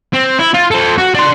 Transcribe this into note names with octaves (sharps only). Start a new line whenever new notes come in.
C4
E4
F4
A4 C5
F#4
D4 C6